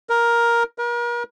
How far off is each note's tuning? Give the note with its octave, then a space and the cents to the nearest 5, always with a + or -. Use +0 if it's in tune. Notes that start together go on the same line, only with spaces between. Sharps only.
A#4 +10
A#4 +40